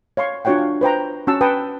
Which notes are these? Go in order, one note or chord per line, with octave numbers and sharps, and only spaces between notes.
C#5 F5 C6 C#6
D4 F4 F#4 C#5 F#5 G5
F5
B4 C5 G5 A#5
C#4 F#4 F#5 A5 E6
B4 F#5 G5 A5 D#6